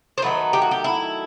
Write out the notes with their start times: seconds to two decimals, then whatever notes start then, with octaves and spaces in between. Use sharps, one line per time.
0.18 C5
0.22 D#3 F#3 A3 B4
0.53 G4
0.62 F#4
0.71 G4
0.84 E4